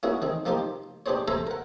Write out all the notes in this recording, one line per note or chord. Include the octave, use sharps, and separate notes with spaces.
A#3 C#4 E4 F#4 G#4
D#3 C4 G#4
F3 A#3 D#4 F4 G4
D4 G4 G#4 C5 C#5
A4 C5 E5 G#5 A#5
A#4 F#5